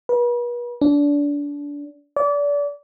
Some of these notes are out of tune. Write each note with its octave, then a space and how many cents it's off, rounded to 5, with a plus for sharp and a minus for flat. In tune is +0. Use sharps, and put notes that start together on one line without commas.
B4 -40
D4 -25
D5 -30